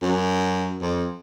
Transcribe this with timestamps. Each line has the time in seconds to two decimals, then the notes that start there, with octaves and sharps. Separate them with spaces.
0.02 F#2
0.81 F2